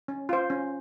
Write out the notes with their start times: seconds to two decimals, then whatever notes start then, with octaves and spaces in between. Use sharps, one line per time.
0.08 C#4
0.29 F4 C5
0.50 C#4